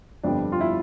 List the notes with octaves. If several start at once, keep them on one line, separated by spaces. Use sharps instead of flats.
G1 F2 D3 G3 B3 D4
F4
E4